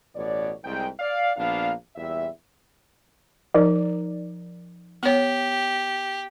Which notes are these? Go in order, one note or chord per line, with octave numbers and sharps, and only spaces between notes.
A1 B2 C#5 D5
C2 G#2 G5
D5 F5
A#1 A#3 B3 D4 F5
E2 A#2 G3 E5
F3 D#4 A#4 D5
B3 G4 C#5